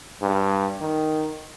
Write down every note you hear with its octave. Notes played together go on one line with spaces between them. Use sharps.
G2
D#3